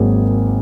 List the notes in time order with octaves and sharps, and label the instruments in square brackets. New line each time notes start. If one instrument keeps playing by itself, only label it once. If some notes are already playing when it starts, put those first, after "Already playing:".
Already playing: [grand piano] G#1 G#2 F#3 A#3 G#4